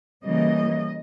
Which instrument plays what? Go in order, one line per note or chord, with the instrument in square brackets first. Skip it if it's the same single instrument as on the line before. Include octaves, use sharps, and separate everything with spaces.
[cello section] C#3 E3 G3 A#3 D#5